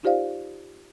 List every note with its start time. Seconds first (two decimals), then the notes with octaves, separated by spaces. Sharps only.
0.03 D#4 F4 G4 C5 D5 F5